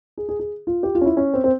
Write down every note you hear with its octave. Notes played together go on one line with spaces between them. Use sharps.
G#4
G#4
G#4
F4
G4
F4
C#4
E4
C#4
C4
C4